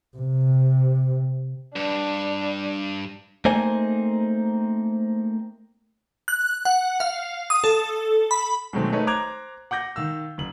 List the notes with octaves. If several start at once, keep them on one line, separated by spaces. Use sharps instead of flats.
C3
G2 D4
A3 A#3 C4 D#4 C5 G#5
F#6
F#5
F5
D#6
A4
B5
B2 D#3 F#3 G#3 A3 C4
A3 D#4 A#4 B4 C#5 D#5
C5 A#5 D6 F#6 G#6 F7
F#5 D6 G6 A#6
D#3 F5 E6
F#1 F#7